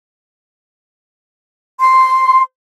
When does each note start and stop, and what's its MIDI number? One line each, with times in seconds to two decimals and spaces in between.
1.79 2.41 84